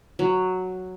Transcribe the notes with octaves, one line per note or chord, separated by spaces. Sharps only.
F#3